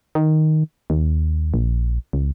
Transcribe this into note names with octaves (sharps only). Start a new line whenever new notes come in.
D#3
D#2
A#1
C#2